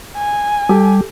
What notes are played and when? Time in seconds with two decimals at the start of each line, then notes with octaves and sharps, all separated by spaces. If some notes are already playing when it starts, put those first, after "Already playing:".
0.16 G#5
0.69 G3 G4 A4